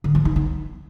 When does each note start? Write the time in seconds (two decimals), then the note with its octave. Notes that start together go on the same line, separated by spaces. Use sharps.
0.04 D3
0.15 F3
0.25 D#4
0.36 B3